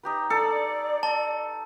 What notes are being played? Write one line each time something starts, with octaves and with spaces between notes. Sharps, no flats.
D#4 G4 B4
A4 D5
A5